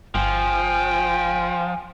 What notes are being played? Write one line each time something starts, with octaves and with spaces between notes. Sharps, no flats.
G1 F3 G5 G#5